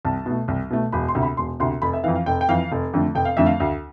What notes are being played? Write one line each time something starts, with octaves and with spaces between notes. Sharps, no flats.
C2 A5
B2 A3
C2
B2 A3
E1 B5
C6
D2 C3
B5
E1 C6
D2 C3 C6
F1 B5
E5
F2 E3 F5
F5
F1 G5
G5
F2 E3 F5
F1
F2 D3 A3
F1 G5
F5
F2 D3 A3 E5
F5
D2